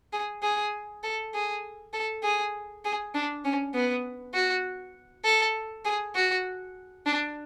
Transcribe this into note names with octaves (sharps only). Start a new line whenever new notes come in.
G#4
G#4
A4
G#4
A4
G#4
G#4
D4
C#4
B3
F#4
A4
G#4
F#4
D4